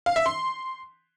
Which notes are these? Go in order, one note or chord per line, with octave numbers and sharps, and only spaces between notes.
F5
E5
C6